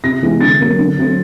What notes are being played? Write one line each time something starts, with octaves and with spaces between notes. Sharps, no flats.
C3 A#6
E3 G#3 B3
D3 A6
F#3 A#3
D3
F#3 A3 C4